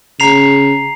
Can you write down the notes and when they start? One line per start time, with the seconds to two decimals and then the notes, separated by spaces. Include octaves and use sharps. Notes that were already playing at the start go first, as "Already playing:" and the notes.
0.20 C#3 A#5 C7 F7